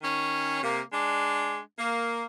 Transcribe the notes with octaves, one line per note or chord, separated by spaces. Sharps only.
D#3 C#4
C3 A#3
G#3 D4
A#3